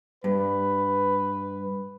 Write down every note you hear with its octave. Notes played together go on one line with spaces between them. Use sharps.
G2 B4